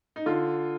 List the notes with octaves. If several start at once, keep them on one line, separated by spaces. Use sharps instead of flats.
D#4
D3 F4